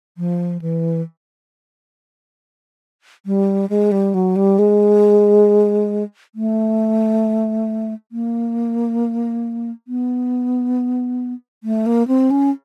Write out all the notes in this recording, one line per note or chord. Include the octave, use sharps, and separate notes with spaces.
F3
E3
G3
G#3
G3
F#3
G3
G#3
A3
A#3
B3
A3
A#3
C4
C#4